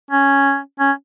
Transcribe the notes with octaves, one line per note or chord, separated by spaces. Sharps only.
C#4
C#4